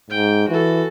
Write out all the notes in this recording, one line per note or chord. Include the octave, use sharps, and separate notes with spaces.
G#2 G5
E3 F#4 A4